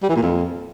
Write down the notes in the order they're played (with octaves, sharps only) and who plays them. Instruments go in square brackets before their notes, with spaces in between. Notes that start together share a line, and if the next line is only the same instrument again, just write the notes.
[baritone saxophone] G3
E3
A#2
F2